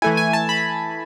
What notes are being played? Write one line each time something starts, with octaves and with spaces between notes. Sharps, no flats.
E3 A3 E4 G#5
G#5
A5
B5